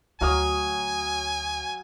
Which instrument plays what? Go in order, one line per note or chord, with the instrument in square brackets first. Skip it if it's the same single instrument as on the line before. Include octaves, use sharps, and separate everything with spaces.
[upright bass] D2 [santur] F#3 F5 D#6 [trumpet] G#5